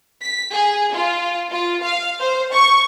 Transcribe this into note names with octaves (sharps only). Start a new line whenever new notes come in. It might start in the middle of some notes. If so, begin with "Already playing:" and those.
B6
G#4
F4
F4
F5
C5
C#6